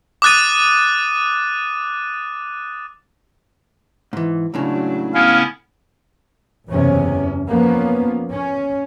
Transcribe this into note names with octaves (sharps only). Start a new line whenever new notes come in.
D6 D#6 F#6 A6 D#7
G#2 E3
C#2 A2 C#3 F#3 D4
B3 C#4 E4 F5
F#1 E2 C3 C#4
F3 A#3 B3 C#4
C#4